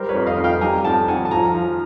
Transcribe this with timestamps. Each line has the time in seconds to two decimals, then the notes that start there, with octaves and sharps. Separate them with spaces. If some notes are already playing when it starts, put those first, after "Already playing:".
Already playing: G3 A#4 C5
0.09 B4 C#5
0.15 F2
0.27 D#5 F5
0.38 F2
0.44 F5 G5
0.61 G3 G#5 A#5
0.84 F2 G5 A5
1.08 F2 F#5 G#5
1.25 A5
1.31 F3 G#5 A#5
1.55 F3